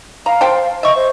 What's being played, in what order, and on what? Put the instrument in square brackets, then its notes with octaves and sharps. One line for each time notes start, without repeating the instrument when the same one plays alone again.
[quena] F5 [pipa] A#5
[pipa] C5 G5 A5
[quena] D#5 [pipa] E5 C#6
[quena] C5